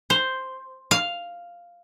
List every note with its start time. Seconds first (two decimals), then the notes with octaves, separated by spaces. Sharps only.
0.10 C5
0.91 F5